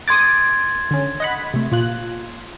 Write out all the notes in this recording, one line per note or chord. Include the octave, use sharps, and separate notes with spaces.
C6 D6 D#6 G#6 A6
D3 C#4
D#5 F#5 B5
C3 A3
A#2 F4 F#6